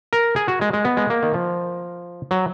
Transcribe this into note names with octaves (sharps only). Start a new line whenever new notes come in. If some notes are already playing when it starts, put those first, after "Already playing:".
A#4
G#4
F#4
G#3
G#3
B3
G#3
A#3
D#3
F3
F#3